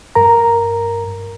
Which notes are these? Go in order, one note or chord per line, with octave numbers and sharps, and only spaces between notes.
G2 A#4 A#5